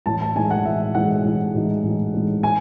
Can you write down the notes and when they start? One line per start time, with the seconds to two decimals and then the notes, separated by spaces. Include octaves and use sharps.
0.06 A1 A5
0.21 A5
0.35 A2 E3 G#3 D#4 G#5
0.51 F#5
0.65 A1 E5
0.95 A2 E3 G#3 D#4 F#5
1.25 A1
1.54 A2 E3 G#3 D#4
1.84 A1
2.13 A2 E3 G#3 D#4
2.43 G#5